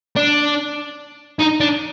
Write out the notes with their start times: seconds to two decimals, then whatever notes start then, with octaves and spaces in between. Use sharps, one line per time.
0.16 D4
1.39 D#4
1.60 D4